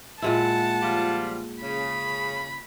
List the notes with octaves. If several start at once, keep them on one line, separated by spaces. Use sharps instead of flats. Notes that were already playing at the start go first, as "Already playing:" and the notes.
A#2 G#3 E4 F#5 A5
F3 G3 F4
C#3 B5